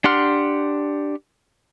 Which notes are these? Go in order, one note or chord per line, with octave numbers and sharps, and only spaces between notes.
D4 G4 F#5 C6 F6